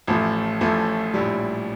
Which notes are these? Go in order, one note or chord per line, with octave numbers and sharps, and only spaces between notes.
A1 A2 F3 A3
A1 A2 F3 A3
A#1 A2 G3